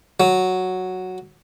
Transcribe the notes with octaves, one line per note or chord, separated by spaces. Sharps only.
F#3